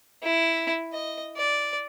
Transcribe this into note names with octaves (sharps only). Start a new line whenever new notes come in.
E4
D#5
D5